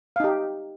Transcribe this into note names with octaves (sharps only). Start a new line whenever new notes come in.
D#4 G4 F5